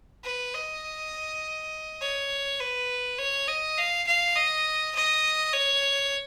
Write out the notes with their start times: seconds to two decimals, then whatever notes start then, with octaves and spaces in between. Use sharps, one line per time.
0.24 B4
0.54 D#5
2.01 C#5
2.60 B4
3.19 C#5
3.48 D#5
3.77 F5
4.07 F5
4.36 D#5
4.95 D#5
5.53 C#5